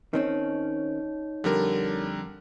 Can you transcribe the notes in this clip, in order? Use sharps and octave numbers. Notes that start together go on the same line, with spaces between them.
D#3 C4 C#4 D#4 C#5
F2 D3 G3 A#4